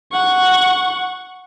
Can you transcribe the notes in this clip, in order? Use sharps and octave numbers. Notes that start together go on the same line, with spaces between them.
F#5 C#6